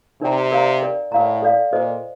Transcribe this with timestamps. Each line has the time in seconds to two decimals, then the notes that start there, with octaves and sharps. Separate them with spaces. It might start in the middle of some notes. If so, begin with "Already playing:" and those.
0.21 C3 D#4 A#4 D5 G5 A#5
0.52 A#4 D5 F5 A#5
0.82 A#4 D5 G5
1.12 A2 A#4 D5 F5 A#5
1.42 A4 D5 F5
1.72 A#2 A4 C5 D#5